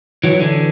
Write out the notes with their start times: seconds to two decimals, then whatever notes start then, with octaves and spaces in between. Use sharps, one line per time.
0.24 E3 F#3
0.40 D3 E3